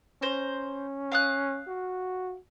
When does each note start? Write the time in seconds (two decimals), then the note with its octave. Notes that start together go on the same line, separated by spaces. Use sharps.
0.22 C#4 C5 A#5
1.12 F5 D#6 F#6
1.68 F#4